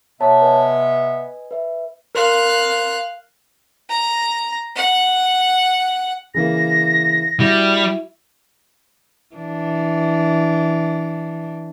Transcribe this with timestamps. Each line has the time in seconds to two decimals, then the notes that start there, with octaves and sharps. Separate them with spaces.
0.21 C3 B3 C#5 E5 A5 A#5
0.42 B4 D#5 G#5
1.51 B4 E5
2.15 A#4 F5 C6 F#6
3.90 A#5
4.76 F#5
6.34 C#3 E3 A#3 A#6
7.40 G3 E4 F#4
9.35 E3 D4